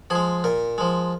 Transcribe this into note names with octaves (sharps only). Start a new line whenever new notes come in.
F3 G#3 G#4
A#2 A#4
F3 G#3